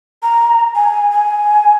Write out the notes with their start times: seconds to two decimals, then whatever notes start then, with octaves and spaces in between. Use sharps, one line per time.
0.23 A#5
0.75 G#5
1.11 G#5